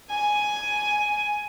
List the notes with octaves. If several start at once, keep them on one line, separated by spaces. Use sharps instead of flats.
G#5